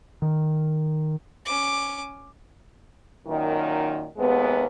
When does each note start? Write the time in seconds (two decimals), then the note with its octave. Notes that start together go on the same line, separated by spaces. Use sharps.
0.22 D#3
1.46 C#4 D6
3.27 F#2 A#2 D#3
4.17 D#2 C3 G#3 B3